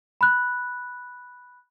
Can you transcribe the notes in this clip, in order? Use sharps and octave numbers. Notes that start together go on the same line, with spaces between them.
B5 F#6